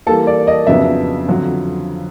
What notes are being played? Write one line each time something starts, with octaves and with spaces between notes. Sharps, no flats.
E3 G3 A#3 A4
D5
D#5
F2 C#3 F#3 B3 D4 E5
F2 D3 F#3